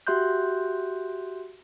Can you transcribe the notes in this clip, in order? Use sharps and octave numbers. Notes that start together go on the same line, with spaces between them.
F#4 G4 E5 C6 F#6 G6